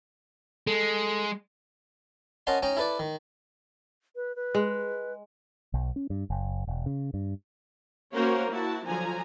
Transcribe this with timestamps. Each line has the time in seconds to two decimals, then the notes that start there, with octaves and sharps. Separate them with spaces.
0.67 G#3 A4
2.47 C#4 A#4 D#5 F#5 A5 C6
2.62 C#4 D#4 D#5 G5
2.77 E4 A4 B4 D5
2.99 D#3
4.16 B4
4.36 B4
4.55 G#3
5.74 B1
5.96 C#4
6.10 G2
6.30 F#1
6.67 E1
6.86 C#3
7.14 G2
8.14 A#3 C#4 F#4 A#4 C5 C#5
8.53 E4 F#4 A5
8.87 D3 F3 F#3 G#5 A#5